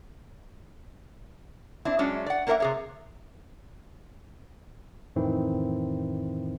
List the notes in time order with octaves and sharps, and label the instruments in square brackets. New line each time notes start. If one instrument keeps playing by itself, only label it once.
[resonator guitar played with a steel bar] C4 D4 E4
F#3 G#3 C#4 D4
D5 F#5
A#3 D4 A#4 C5 E5 F#5
C3 G#4 C#5
[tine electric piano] F2 A2 D#3 E3 C4 E4